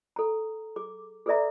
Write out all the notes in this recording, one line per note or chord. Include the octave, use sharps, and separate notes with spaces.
A4 A#5
G#4 D6
G#4 A4 B4 D5 E5 A#5